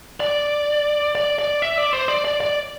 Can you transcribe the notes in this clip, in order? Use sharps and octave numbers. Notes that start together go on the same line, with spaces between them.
D5
D5
D5
E5
D5
C5
D5
D5
D5